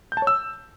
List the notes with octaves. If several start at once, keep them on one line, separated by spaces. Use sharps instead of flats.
G6
A5
C#5
E6